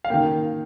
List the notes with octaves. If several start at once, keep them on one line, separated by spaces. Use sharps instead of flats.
F5
D#3 A#3 G5